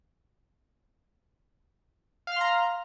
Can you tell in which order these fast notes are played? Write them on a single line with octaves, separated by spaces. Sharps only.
F5 F6 C6 A#5